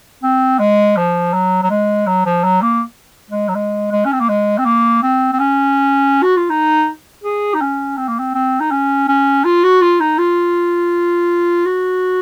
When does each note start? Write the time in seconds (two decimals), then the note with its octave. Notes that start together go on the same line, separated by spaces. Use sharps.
0.23 C4
0.59 G#3
0.97 F3
1.33 F#3
1.63 F#3
1.70 G#3
2.07 F#3
2.26 F3
2.44 F#3
2.62 A#3
3.30 G#3
3.48 F#3
3.55 G#3
3.92 G#3
4.05 C#4
4.13 C4
4.21 A#3
4.29 G#3
4.58 C4
4.65 A#3
5.03 C4
5.33 C4
5.40 C#4
6.23 F#4
6.37 F4
6.50 D#4
7.24 G#4
7.54 D#4
7.61 C#4
7.97 C4
8.08 A#3
8.19 C4
8.34 C4
8.60 D#4
8.71 C#4
9.08 C#4
9.45 F4
9.64 F#4
9.82 F4
10.00 D#4
10.18 F4
11.66 F#4